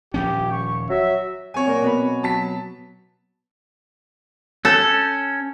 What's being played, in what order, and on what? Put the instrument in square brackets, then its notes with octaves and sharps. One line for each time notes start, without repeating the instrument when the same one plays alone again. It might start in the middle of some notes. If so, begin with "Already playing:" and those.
[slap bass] D#1 F3 C#4 [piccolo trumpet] G4
[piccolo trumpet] C#6
[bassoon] F#3 [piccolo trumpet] E5
[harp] F#3 C4 [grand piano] C#5 G#5
[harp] A#2 A#4
B2 F#4 B5
[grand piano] F#3 A5 B6
[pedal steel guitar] C#4 F#6 G6 [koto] A4